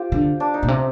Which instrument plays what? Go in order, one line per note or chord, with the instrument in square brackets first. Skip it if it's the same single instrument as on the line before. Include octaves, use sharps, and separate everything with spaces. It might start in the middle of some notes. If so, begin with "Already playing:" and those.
Already playing: [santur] F4 G4 C5
[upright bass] D3
[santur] D4
D#4
[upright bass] A#2
C3